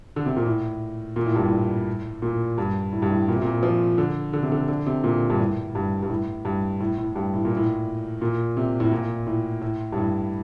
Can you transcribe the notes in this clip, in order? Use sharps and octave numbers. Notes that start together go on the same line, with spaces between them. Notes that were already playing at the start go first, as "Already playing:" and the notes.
D3
C3
A#2
A2
A#2
A2
G2
A2
A#2
G2
A2
G2
A2
A#2
C3
A#2
F3
D3
D3
C3
D3
D3
C3
A#2
G2
A2
G2
G2
A2
G2
A2
A2
G2
A2
A#2
A2
A#2
C3
A2
A#2
A2
A2
G2
A2